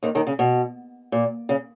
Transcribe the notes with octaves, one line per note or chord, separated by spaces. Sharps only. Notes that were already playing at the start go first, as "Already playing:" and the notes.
D#2 D#3
D#2 D#3
C#3
B2
A#2
C#3